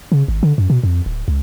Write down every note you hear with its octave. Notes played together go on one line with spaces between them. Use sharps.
C#3
G#1
D3
F#2
B2
F2
D1
C#2